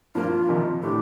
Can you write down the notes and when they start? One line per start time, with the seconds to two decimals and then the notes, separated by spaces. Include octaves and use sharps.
0.15 G2 F3 A#3 F4
0.49 F2 C3 D#3
0.83 A2 A3 D4 G4